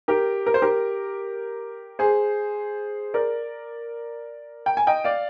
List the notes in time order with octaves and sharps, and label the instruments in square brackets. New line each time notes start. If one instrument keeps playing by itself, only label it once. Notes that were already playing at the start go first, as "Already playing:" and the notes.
[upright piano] G4 A#4
A#4
C5
G4 A#4
G#4 C5
A#4 D5
G5
G#5
D#5 G5
D5 F5